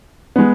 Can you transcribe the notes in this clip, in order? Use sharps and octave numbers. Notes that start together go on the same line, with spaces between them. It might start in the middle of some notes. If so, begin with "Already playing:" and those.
G#3 B3